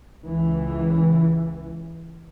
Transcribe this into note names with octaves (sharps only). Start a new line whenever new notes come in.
C#2 E3